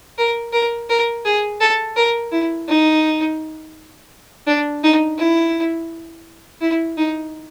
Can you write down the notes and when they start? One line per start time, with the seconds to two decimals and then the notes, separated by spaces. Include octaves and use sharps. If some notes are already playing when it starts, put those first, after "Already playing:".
0.18 A#4
0.53 A#4
0.90 A#4
1.25 G#4
1.60 A4
1.96 A#4
2.32 E4
2.68 D#4
4.47 D4
4.83 D#4
5.18 E4
6.61 E4
6.97 D#4